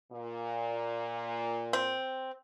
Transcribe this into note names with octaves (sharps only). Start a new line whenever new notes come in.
A#2
C4